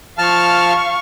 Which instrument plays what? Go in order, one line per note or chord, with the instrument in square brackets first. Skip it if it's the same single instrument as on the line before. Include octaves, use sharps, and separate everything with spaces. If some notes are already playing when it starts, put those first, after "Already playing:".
[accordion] F3 A5 F6 [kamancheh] F5 C#6